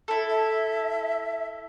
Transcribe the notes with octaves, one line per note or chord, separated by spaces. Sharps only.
E4 A4
E5